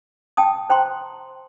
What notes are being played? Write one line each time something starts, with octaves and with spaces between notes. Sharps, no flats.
G5 A5 D#6
C5 G5 A#5 C6